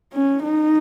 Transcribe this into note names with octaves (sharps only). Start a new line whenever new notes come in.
C#4
D#4